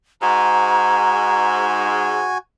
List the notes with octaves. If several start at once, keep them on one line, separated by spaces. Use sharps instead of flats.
G#2 F#4 G#5 A#5